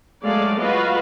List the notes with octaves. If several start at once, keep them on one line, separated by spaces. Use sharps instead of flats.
F#3 G#3 A3 A4 D5 F5
F4 F#4 B4 D#5 F5